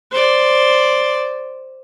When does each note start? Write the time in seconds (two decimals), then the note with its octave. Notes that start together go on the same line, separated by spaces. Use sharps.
0.11 C5 D5